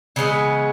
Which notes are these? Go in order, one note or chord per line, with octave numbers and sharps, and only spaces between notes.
C#3 E3 G#3 B3